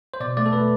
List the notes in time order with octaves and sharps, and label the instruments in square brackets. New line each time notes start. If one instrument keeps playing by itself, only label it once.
[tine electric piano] C5
B2 D5
A3 D5
A4
A3 B4